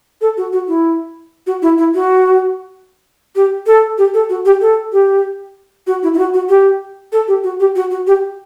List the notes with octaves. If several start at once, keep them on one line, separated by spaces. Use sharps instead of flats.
A4
F#4
F#4
E4
F#4
E4
E4
F#4
G4
A4
G4
A4
F#4
G4
A4
G4
F#4
E4
E4
F#4
F#4
G4
A4
G4
F#4
G4
F#4
F#4
G4